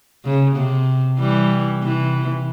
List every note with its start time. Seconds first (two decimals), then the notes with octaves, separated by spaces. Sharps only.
0.25 C#3
0.55 C3
1.19 E3 G3
1.83 C3 E3